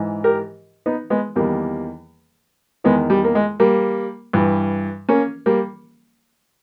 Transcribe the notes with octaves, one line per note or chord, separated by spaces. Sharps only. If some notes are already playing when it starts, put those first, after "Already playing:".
Already playing: G#2 E3
G4 A#4
B3 D#4
G#3 B3
E2 D#3 G3 A#3
E2 D#3 G#3 B3
G3
A#3
G#3
G3 A#3
G2 E3
A#3 C#4
G3 A#3